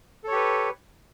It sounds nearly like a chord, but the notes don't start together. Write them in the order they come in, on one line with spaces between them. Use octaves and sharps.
A4 C#5 G4 B4